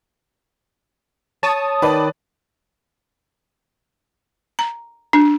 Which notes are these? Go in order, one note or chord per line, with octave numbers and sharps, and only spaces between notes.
C#5 A5 D#6
D#3 B4 D5
A#5
D4